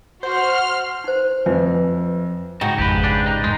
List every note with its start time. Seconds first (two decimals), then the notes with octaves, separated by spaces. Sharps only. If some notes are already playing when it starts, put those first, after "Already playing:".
0.23 F#4 C5 C6 F6
1.04 D#4 C5
1.46 F2 B4 E5
2.61 G#2 C#3 D#4 F#4 G5
2.78 G#1 F2 G4 B4 B5
3.04 D4
3.26 D#4
3.44 E2 G#2 G#3 A6